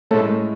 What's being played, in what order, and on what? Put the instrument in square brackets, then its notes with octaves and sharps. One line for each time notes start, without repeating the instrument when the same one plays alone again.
[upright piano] A2 G#3 C#4 [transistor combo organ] A3